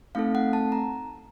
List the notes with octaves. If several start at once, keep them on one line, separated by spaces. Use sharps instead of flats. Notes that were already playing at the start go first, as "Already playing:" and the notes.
A3 C4 D#4 A4 F5
F#5
A5
A#5